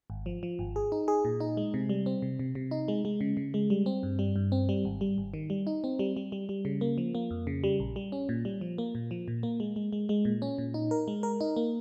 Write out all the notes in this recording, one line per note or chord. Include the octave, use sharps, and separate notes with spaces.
G#1
F3
F3
G#1
G#4
D#4
G#4
A#2
D#4
G#3
C3
G3
C4
C3
C3
C3
D#4
G#3
G#3
C#3
C#3
G#3
G3
C4
G2
G3
G2
C4
G3
G#1
G3
G#1
D#3
G3
D#4
C4
G3
G3
G3
G3
C#3
A#3
F3
A#3
F2
C#3
G3
A#1
G3
C#4
A#2
G3
F3
A#3
A#2
F3
A#2
A#3
G#3
G#3
G#3
G#3
A#2
C#4
A#2
D#4
A#4
G#3
A#4
D#4
A#3